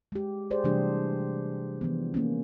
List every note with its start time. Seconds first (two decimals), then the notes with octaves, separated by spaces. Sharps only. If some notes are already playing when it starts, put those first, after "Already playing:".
0.12 G#3 G4
0.51 G4 G#4 C5 D5
0.64 C3 E3 G3 A3 D4 G4
1.81 E3 F3 B3
2.14 A#3 C4 C#4